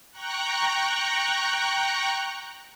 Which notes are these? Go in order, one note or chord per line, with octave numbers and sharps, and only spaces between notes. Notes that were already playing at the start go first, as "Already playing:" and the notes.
G5 A#5 C#6 F#6